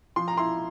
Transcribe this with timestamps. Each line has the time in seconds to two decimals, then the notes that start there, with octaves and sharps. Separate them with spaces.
0.16 F3 C6
0.28 A#5
0.37 E4 C6